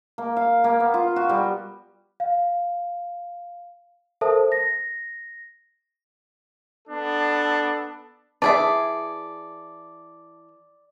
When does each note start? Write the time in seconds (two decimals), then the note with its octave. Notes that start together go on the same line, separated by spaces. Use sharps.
0.18 A#3
0.37 F5
0.64 A#3
0.80 B3
0.94 F4
1.16 F#4
1.29 G3
2.20 F5
4.21 A4 A#4 C5 E5 A5 D#6
4.52 A#6
6.88 B3 D4 A4
8.42 E3 G#4 D5 E5 A5